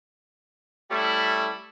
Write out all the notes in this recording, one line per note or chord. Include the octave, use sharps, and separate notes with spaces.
G3 A3 C#4 E4